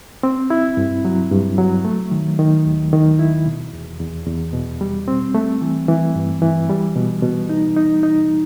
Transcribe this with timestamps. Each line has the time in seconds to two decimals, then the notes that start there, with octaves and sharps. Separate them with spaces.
0.23 C4
0.50 E4
0.77 G2
1.05 F#3
1.31 G2
1.58 F#3
1.85 A3
2.11 D#3
2.39 D#3
2.65 D#2
2.93 D#3
3.19 E4
3.46 B2
3.73 E2
4.00 E2
4.27 E2
4.54 B2
4.81 G3
5.08 C4
5.35 A3
5.62 E3
5.88 E3
6.15 G2
6.42 E3
6.69 G3
6.96 B2
7.23 B2
7.49 D#4
7.77 D#4
8.03 D#4